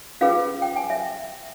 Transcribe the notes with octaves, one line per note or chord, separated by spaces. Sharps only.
C#4 F4 G#4 B4 F5
G5
G#5
E5